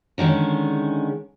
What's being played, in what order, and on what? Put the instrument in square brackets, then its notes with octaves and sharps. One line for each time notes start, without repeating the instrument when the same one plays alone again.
[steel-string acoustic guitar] D3 D#3 G#3 C#4